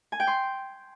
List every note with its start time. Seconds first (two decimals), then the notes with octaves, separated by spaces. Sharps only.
0.12 G#5
0.20 G5
0.27 C6